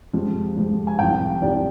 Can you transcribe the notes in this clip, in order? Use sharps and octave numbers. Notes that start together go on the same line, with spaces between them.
F2 C3 F3 G#3
F2 C3 F3 G#3
G#5
C2 C3 F3 G5
C2 C3 F3 D5